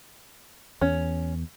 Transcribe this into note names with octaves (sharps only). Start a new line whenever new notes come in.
E2 C#4